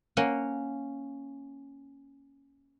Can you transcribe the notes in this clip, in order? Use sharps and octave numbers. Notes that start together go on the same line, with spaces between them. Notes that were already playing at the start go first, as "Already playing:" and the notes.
A#3 C#4 F#5